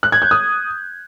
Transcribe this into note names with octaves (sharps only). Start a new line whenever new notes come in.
F#6
G#6
G6
D#6